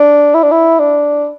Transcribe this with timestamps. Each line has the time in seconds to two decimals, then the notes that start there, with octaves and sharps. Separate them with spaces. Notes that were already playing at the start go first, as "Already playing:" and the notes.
Already playing: D4
0.34 E4
0.43 D4
0.51 E4
0.79 D4